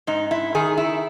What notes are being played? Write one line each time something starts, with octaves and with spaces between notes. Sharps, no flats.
G#2 D#4
E4
D#3 G#4
E4